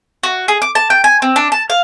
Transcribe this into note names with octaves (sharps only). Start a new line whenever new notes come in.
F#4
G#4
D6
A5
G5
G#5
C4
D4
A5
F5